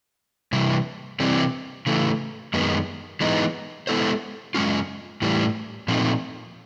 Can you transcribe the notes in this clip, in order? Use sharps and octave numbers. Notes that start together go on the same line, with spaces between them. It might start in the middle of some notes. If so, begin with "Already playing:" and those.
C3 E3 G3
C3 E3 G3 C4
C#3 E3 A3
F#2 D#3 G#3 B3
E3 G#3 B3 D#4
G#3 B3 E4 A4 C5
F#2 D#3 G#3 C#4 F4
A2 E3 G3
A#2 F3 A3 C4 D#4